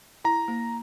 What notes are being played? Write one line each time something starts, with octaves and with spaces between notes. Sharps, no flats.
E4 A#5
A#3